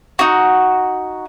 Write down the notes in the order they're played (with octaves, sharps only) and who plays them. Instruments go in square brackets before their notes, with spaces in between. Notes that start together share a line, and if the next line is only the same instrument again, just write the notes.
[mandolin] D#4 F#4